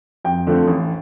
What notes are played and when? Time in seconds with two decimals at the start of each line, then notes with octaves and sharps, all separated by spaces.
0.25 F2 G5
0.47 D3 F3 A3 C4
0.68 A1